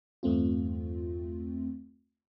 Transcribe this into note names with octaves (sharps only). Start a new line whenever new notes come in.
E2 G2 A3 C4 F4